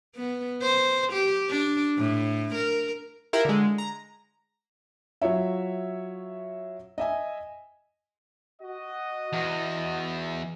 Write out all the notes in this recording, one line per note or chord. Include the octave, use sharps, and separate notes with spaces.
B3
C5
G4
D4
A2
A#4
E4 F4 G4 A#4
D3 G#3
A#5
F#3 F4 C#5 E5
D#5 E5 G#5
F#4 D#5
E2